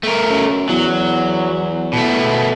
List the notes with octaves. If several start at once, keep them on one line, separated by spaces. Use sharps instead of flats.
A3 A#4
F#2
E2 F#3
B2 A3